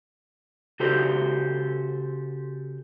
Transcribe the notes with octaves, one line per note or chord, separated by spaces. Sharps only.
C#3 F#4 G4 A4 C5